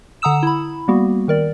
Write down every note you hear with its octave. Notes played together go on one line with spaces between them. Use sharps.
D3 F#5 A#5 D#6 E6 E7
E4 B5
G3 A#3 B3 F#4
D#3 A#4 D5